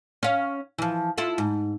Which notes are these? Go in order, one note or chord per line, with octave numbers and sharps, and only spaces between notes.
C#4 F5
E3 F3
E4 F4 A4
G#2